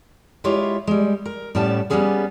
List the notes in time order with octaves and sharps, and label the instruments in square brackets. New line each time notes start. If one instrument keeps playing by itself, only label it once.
[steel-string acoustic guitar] G#3 E4 F4 G4 C#5
G3 G#3
A#4
A2 G3 B3 C#4 A5
G3 A#3 B3 C#4 G#4 A4